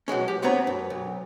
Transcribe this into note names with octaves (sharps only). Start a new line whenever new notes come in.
B2 F#3 G#3 C#4
G4
G#3 B3 C4 D4 C#5 A#5
F#2
B1